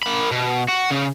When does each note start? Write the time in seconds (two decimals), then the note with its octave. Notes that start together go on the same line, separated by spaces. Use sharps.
0.03 A#3 B5
0.31 B2
0.69 F#4
0.91 C#3